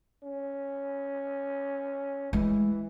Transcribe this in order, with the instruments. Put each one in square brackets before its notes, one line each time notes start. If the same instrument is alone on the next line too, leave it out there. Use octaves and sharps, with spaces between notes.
[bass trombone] C#4
[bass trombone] E3 [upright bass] G#3 A3